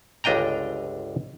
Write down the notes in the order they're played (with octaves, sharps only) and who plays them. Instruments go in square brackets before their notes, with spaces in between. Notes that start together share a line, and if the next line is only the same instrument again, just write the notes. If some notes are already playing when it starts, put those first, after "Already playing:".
[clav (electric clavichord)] G1 C#2 D4 D#5 G5 A#5